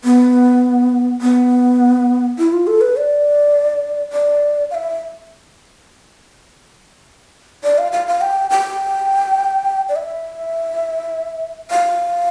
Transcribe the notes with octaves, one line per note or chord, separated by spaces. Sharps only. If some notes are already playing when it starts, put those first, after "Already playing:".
B3
B3
E4
F4
A4
B4
D5
D5
F5
E5
D5
F5
F5
F5
G5
G5
D5
E5
F5